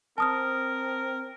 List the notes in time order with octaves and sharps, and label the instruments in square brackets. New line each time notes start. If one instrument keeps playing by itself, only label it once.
[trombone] C4 [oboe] A#4 [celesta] A5 D#6 F6